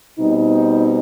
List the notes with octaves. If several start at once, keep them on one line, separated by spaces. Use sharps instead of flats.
B2 G3 C4 D#4